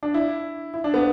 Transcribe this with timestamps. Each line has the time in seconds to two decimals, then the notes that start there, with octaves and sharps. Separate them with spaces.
0.03 D4
0.14 E4
0.74 E4
0.84 D4
0.94 B3